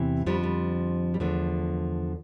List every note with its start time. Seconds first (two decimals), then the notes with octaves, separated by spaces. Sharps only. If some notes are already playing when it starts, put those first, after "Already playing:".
Already playing: E2 C3 E3
0.26 F2 D3 F3 G3
0.43 G3
1.14 G3
1.20 E2 D3 F3 A3